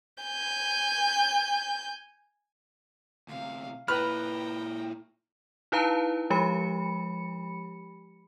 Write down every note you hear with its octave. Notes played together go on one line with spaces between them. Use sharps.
G#5 G6
D2 C3 F5
A#2 E4 B4 G5 A#5 F6
D#4 E4 B4 F5 A5 A#5
F3 G#3 G4 B5 C#7